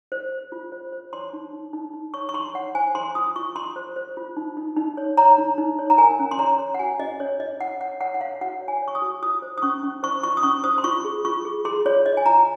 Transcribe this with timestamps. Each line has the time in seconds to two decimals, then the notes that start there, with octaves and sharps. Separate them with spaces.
0.12 C5
0.32 C5
0.52 F4
0.72 C5
0.92 C5
1.13 C#5 C6
1.33 D#4
1.53 D#4
1.73 D#4
1.93 D#4
2.14 C#5 C#6
2.29 C#6
2.34 D#4 C6
2.54 C#5 F#5
2.75 C5 G#5
2.95 C5 C6
3.15 F4 D#6
3.36 F4 C#6
3.55 F4 C6
3.76 C5
3.96 C5
4.17 F4
4.37 D#4
4.57 D#4
4.77 D#4
4.97 C#5
5.17 C#5 A#5
5.38 D#4
5.58 D#4
5.79 C#5
5.90 A#5
5.98 A#4 G#5
6.19 C#4
6.31 C6
6.39 C#5 A#5
6.59 C#5
6.74 F#5
6.79 F#4 G#5
7.00 C#4 D#5
7.20 C#4 C#5
7.40 C#5 D#5
7.60 C#5 F#5
7.81 C#5 F#5
8.00 C#5 F#5
8.14 F#5
8.21 C#5 F5
8.41 F#4 F#5
8.61 C#5
8.68 G#5
8.82 C#5
8.88 C#6
8.95 D#6
9.02 F#4
9.22 F4 D#6
9.42 C5
9.58 D#6
9.62 C#4 C#6
9.83 C#4
10.03 C5 C#6
10.23 F4 C#6
10.37 D#6
10.43 C#4 C#6
10.64 C5 D#6
10.78 C6
10.84 F4 C#6
11.05 G#4
11.25 F4 C#6
11.45 G#4
11.65 G#4 C6
11.85 F4 C#5
12.06 C#5 D#5
12.17 G#5
12.26 F4 A#5